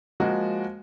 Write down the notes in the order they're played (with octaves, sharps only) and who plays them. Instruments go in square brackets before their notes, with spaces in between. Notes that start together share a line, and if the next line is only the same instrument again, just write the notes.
[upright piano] F3 G#3 A#3 F#4